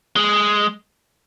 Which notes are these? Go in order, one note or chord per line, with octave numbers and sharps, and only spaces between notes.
G#3